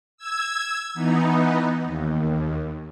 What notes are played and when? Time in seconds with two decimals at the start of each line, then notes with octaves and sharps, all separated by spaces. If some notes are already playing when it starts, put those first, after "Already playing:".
0.17 E6 G#6
0.94 E3 B3 D#4
1.84 D#2